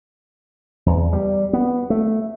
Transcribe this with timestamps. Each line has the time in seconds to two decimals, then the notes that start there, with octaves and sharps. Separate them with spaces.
0.86 E2
1.13 G3
1.53 B3
1.90 A3